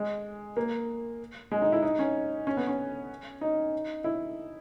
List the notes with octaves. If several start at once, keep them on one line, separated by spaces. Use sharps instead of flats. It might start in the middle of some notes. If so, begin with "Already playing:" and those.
Already playing: G#3
A#3
G#3
D#4
E4
D#4
C#4
C#4
B3
C#4
D#4
E4